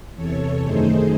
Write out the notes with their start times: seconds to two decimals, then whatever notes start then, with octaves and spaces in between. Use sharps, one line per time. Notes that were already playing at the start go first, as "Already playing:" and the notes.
0.15 E2 C3 E3 A4 C#5
0.62 F#2 D#3 A3 D#4 G#4 C5